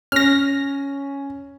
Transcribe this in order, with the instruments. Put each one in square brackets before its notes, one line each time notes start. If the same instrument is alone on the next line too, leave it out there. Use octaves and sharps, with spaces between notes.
[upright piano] C#4 [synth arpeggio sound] F6 A#6